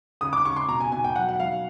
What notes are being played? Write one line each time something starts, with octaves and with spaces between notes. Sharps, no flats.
C#3 D#6
D6
C#3 C#6
C6
B2 A#5
G#5
B2 G#5
G5
F#3 F#5
F#5
F#3 F5